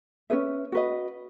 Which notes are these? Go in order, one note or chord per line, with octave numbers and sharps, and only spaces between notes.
C#4 G#4 B4 E5
F#4 B4 D#5